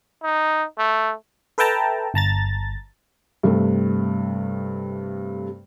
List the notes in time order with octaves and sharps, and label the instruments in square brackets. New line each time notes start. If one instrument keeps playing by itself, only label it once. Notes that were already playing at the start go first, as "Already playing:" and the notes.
[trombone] D#4
A3
[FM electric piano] A4 B4 E5 G5 A5 A#5
G1 A5 A#5 A6
[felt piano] G2 C3 A3